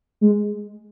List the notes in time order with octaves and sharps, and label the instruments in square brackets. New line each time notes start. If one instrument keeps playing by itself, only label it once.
[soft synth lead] G#3